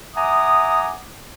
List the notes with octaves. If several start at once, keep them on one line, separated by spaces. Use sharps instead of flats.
E5 F#5 G#5 A#5 D6 D#6